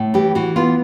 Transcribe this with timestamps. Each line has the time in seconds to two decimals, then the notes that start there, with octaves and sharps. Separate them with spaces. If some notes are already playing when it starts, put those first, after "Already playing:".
Already playing: A2
0.14 E3 G4
0.35 E3 F#4
0.56 B3 F4